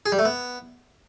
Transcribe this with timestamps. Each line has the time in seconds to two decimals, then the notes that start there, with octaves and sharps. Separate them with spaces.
0.06 G#4
0.12 G3
0.19 A3
0.25 B3